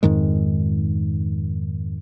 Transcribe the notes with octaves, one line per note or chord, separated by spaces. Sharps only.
F2 G#2 D#3 G#3